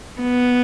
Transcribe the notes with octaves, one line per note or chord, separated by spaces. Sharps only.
B3